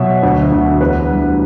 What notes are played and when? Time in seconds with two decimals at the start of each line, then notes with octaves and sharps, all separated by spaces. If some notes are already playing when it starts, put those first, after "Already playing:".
Already playing: B2 F#3 E5
0.23 D2
0.52 D2
0.81 E2 B4
1.10 G3